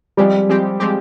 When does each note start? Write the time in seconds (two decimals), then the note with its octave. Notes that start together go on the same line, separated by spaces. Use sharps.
0.17 F3 G3 G#3 C4 G4
0.49 F3 G#3 C4 G4
0.80 F3 G#3 C4 G4